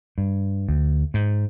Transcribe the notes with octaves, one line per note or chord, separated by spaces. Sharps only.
G2
D2
G#2